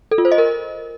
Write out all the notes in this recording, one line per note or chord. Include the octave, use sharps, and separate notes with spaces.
A4
F4
C5
D#5
A#4